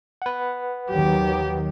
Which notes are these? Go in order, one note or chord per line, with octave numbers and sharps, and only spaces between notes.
B4 F#5
D#2 D#3 F#3 G4